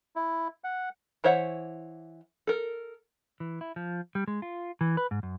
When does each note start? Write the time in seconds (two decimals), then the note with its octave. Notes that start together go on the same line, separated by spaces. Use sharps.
0.16 E4
0.64 F#5
1.24 E3 C5 C#5 E5 F#5
2.47 A4 A#4
3.40 E3
3.61 E4
3.76 F3
4.15 G3
4.28 G#3
4.42 F4
4.81 E3
4.97 B4
5.11 G#2
5.23 F#2